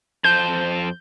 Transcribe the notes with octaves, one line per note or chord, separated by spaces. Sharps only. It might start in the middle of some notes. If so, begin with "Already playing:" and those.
F2 C5 A5 G6